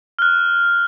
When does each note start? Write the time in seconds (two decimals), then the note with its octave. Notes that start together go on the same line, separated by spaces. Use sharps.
0.19 F6 F#6